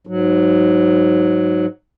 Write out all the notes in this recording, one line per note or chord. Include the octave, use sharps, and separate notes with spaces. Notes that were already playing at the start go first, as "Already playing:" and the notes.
G#2 F#3